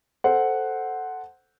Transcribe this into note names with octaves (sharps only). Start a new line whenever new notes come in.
A4 C5 F#5